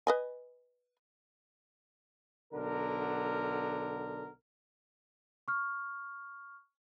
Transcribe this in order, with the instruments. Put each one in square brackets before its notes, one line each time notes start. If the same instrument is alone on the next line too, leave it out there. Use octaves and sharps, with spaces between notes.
[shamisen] B4 D#5 G#5
[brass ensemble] B1 D3 A#4
[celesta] C#6 F6